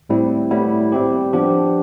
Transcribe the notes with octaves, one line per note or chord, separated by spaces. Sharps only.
A2 G3 C4 E4
A2 G3 B3 E4
G3 C4 G4
F3 B3 D4 G4